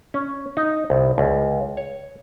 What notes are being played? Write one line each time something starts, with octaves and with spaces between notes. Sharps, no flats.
C#4
D#4
C2
C#2
C#5